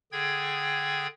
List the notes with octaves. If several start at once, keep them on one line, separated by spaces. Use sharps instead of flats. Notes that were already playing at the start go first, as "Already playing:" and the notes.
D3 G#4 G5 G#6